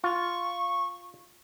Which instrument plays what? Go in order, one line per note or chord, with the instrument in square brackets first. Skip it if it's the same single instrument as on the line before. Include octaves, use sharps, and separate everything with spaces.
[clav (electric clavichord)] F4 [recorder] C#6